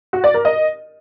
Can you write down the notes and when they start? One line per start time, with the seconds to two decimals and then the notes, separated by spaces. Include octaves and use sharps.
0.13 F#4
0.24 D5
0.34 A#4
0.45 D#5